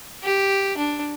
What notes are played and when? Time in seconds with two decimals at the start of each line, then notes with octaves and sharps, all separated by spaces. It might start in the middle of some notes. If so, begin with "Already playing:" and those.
0.23 G4
0.77 D4